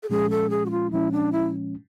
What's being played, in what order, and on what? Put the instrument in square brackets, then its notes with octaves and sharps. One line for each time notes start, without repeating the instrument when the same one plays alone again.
[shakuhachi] A4
[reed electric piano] A#2 F3 G#3 C#4 [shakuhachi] G#4
[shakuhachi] A4
G#4
F#4
F4
[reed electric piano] A#2 F3 G#3 C#4 [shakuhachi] E4
[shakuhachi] D4
E4